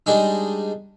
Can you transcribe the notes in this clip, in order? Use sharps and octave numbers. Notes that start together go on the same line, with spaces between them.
G3 G#3 D4 D#4